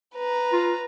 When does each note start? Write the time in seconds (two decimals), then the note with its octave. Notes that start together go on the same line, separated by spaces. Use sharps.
0.15 B4 A#5
0.52 F4